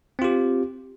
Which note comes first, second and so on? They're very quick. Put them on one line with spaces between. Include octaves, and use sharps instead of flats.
C4 F4 G4